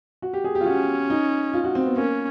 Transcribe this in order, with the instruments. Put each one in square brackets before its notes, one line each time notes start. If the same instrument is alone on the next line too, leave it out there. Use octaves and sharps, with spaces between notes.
[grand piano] F#4
G4
G#4
G4
F4
[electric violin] C#4 [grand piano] F#4
[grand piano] D#4
F4
F#4
C4
B3
[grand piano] A#3 [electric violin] C#4